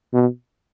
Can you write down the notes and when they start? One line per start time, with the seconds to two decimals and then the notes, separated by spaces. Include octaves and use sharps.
0.13 B2